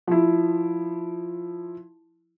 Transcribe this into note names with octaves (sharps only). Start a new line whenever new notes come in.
F3 E4